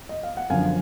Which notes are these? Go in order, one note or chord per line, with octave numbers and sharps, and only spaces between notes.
D#5
F5
F#5
F#2 D3 F3 F5 G#5